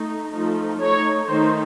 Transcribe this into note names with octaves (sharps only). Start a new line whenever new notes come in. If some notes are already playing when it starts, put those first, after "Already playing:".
Already playing: A3 D#4
F3 A3 D#4
A3 D#4 C#5
D#3 A3 D#4 C5